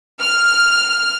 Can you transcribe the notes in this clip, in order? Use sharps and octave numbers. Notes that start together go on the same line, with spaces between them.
F6